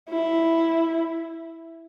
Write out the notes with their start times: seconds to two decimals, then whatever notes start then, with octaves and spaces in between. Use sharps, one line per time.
0.10 E4